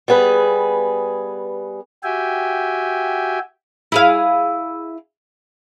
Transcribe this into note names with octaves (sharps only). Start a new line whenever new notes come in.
G3 B3 G#4 B4
F#4 G4 E5 G5 G#5
E4 G#4 F5